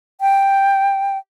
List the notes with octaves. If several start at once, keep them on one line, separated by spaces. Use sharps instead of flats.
G5